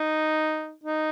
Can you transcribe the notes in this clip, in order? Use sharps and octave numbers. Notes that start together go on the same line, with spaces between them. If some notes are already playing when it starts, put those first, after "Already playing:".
Already playing: D#4
D#4